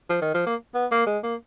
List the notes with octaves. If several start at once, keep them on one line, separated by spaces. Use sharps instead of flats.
F3
D#3
F3
A#3
B3
A#3
G#3
A#3